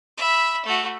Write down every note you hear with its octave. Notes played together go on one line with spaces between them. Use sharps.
E5 B5
A3 F#4